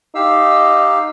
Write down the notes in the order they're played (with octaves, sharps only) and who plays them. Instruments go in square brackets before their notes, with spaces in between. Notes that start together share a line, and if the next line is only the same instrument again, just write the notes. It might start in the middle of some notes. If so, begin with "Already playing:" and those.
[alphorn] D#4 [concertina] G4 F5 E6